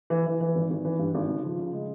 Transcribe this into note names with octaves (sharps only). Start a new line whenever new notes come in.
E3
E3
E3
G#1
G#1
E3
G2
G#1
C#3
F3
C#3
G#3